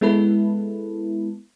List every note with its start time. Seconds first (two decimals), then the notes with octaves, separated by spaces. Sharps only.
0.01 G#3 B3 E4 A4 B4